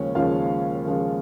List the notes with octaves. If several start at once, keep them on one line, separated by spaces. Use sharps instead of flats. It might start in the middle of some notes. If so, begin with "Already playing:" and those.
Already playing: D#2 C#3 F3 G#3 C#4
D#2 C#3 F3 G#3 F4 F5
D#2 C#3 F3 G#3